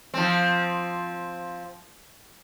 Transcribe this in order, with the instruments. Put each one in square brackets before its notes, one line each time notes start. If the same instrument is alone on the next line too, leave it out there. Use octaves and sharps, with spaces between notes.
[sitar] F3 C4